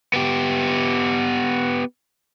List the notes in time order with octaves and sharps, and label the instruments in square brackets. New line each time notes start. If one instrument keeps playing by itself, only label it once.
[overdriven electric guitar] B3 G4